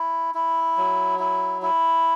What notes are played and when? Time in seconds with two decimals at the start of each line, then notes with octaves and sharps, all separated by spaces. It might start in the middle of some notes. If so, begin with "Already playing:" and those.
Already playing: E4
0.35 E4
0.77 F#3
1.19 E4
1.62 E4